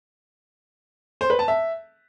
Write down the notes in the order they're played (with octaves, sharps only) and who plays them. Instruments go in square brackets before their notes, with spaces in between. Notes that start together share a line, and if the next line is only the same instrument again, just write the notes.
[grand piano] C5
B4
A5
E5